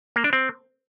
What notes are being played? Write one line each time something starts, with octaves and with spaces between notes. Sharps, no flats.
A#3
D4
C4